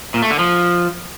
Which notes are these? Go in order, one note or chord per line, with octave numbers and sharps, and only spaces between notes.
A#2
A3
D3
F3